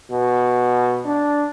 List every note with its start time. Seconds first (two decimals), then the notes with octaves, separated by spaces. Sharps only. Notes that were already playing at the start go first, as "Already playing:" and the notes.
0.11 B2
1.05 D4